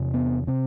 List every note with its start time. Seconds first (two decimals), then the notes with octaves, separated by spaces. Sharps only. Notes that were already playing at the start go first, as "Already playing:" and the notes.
Already playing: E2 C3
0.14 B3
0.47 C3 C4